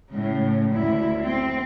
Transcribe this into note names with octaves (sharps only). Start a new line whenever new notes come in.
A2 C#3
D2 E4
C4